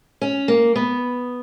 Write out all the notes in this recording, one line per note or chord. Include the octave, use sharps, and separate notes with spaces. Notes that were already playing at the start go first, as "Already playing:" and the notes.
C#4
A#3
B3